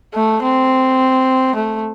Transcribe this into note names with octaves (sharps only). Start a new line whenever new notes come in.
A3
C4
A3